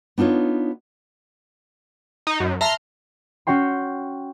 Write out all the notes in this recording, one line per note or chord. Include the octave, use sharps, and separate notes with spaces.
B3 D4 D#4 F4 C#5
D#4
F#2
E5 A5 A#5 C6 F6
C#4 F#4 C#5 G5 C6